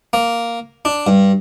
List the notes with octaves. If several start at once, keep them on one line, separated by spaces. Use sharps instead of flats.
A#3
D4
G2